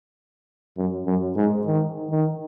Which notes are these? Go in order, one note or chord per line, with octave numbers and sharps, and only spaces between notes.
F#2
F#2
G#2
D#3
D#3